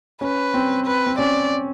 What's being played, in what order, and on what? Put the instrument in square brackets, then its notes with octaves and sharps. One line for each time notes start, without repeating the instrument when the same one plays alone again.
[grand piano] C#4 [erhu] B4
[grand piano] C4
[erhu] B4
[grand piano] C4
[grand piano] C#4 [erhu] D5